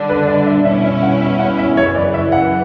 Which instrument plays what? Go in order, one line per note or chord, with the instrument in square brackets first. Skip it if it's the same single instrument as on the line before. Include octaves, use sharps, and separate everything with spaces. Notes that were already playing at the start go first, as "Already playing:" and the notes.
Already playing: [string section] D3 G3 D4
[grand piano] B4
D5
E5
[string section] B2 G3 C#4 E4 [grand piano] E5
[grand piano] E5
F#5
E5
F#5
E5
[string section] F#2 C#3 E3 [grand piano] C#5
[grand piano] D5
E5
F#5